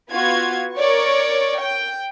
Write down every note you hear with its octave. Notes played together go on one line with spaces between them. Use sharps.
B3 F4 F#4 G#6
A#4 C#5 D5 C#6
G5